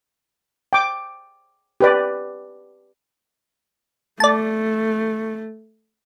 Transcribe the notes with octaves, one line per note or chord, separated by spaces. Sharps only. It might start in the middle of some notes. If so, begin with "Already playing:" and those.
G5 D6
G4 B4 D5
A3 D5 A5